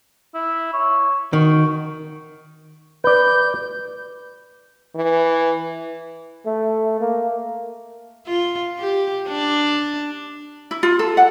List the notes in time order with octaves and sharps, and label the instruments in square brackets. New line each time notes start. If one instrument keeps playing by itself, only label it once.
[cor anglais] E4
C#5
[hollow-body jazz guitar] D#3 [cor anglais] F#4
[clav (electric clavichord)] B4 D5 [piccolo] G6
[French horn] E3
[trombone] A3
A#3
[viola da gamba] F4
G4
D4
[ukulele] E4
F4
A4
F#5